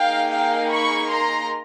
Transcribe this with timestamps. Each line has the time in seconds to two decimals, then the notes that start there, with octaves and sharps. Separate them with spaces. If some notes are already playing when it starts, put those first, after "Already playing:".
Already playing: A#3 D#4 G#4 F5 G5
0.30 F5 G5
0.70 B5 C#6
1.08 A#5 C6